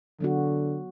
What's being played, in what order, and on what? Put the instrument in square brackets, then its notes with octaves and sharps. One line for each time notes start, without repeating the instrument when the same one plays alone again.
[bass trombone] D3 [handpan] F#3 B3 F#4